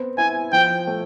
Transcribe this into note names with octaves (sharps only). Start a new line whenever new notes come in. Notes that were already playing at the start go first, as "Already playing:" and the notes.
Already playing: B3 C4
E4 G#5
F3 G5
A3